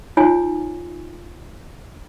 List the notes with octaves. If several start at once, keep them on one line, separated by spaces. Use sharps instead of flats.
D#4 F4 C#5 G#5